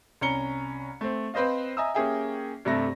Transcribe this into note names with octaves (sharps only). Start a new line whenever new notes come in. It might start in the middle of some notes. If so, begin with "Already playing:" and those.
C2 C#4 A#5 C#7 G7
A3 C4
C4 B4 C5 D#5 F5
D#5 E5 G#5 A#5 D#6 E6
A#3 C#4 G4 G#4 E5 G5
G2 C3 A3 A4 E5 A#6